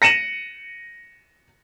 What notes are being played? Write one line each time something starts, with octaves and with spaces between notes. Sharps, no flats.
A#6 C#7 D#7 E7 F#7